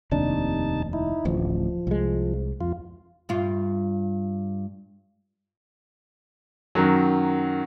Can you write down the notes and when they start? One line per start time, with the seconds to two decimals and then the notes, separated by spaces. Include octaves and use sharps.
0.12 F1 D#2 C3 D4 D#4 A5
0.93 D#4 E4
1.25 D1 A1 F3
1.87 C2 G#3
2.61 F2 F4
3.29 G2 F4
6.75 F#2 D#3 F#3